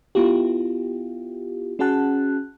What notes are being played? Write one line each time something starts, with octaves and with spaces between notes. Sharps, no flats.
B3 E4 F4 G4
C#4 F#4 G#4 F#5 A5 F#6